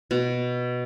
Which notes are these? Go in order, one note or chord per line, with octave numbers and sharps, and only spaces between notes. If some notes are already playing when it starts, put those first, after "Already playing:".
B2